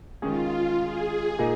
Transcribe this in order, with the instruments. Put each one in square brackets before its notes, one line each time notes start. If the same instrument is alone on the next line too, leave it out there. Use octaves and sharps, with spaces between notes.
[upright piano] D#3 G#3 C#4 G#4 [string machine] F4
[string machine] G#4
[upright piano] A#2 A#3 D#4 G#4